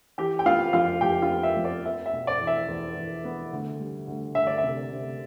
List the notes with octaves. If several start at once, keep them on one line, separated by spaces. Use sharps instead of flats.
E3 G4 G5
G5
B3 F4 F5
F2 F4 F5
F2 G4 G5
F4 F5
B3
E5
F2
D5
B3 E5
E5
B2
D5
E2
E5
E2
E2
B3
D2
G3
D2
D2 E5
D5
E5
C3
C3